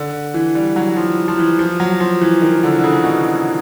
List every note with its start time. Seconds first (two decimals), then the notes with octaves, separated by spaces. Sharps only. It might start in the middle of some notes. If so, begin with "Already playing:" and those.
Already playing: D3
0.34 E3
0.55 G3
0.76 F#3
0.97 F3
1.28 F3
1.38 E3
1.59 F3
1.80 F#3
2.00 F3
2.21 E3
2.42 D#3
2.63 D3
2.79 D3
2.84 C#3
3.04 B2